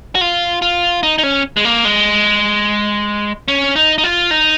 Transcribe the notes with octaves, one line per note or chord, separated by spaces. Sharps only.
F#4
F4
F4
D#4
D#4
C#4
G#3
A#3
G#3
C#4
D#4
D#4
F4
D#4